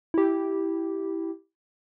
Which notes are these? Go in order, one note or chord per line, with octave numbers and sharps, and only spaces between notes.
E4 G4